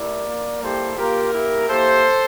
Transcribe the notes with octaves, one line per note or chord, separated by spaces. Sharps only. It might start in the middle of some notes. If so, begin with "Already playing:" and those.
Already playing: A3 E4 G4 A#4 D5
A#3 F4
G3 A#3 E4 G4 A4 C5
A#3 F4 G4 A#4
A#3 E4 G4
A#3 E4 G4 A4 C5